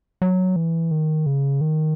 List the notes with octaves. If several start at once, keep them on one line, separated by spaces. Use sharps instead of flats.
F#3
E3
D#3
C#3
D#3